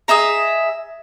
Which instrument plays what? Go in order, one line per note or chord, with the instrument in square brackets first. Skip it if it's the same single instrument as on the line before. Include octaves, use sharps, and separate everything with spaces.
[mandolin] G#4 D#5 E5 A#5